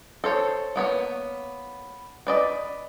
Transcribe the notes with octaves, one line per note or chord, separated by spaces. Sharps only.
A4 C5 C#5
A#3 B3 C#5
B4 D5 D#5